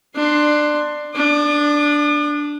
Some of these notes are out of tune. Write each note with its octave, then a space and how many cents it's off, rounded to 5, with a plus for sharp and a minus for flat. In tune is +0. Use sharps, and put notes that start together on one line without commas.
D4 +20 C6 +0
D4 +0 D6 +45